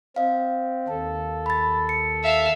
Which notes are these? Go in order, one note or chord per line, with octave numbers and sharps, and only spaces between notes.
C4 D#5 F5
D#2 A4
B5 A6
C#7
E5 F5